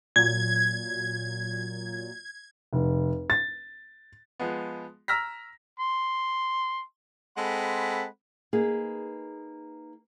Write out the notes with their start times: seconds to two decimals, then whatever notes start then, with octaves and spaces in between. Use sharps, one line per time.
0.16 A#2 F#3 G#6
2.73 F1
3.30 A6
4.40 F3 G#3 B3
5.08 A#5 E6 F6 A#6 B6
5.80 C6
7.37 G#3 C4 A4 F#5 B5
8.53 A#3 D#4 G#4 B4